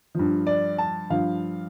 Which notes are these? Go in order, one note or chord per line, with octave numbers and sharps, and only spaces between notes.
G2 F3
D5
A5
G2 F3 F5